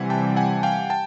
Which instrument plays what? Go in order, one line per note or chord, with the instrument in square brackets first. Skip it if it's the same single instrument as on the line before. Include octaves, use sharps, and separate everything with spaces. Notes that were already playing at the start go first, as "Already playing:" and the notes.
Already playing: [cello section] C3 E3 G3 [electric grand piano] F#5 G#5
[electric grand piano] G5 A5
F#5 G#5
F5 G5
G5 A5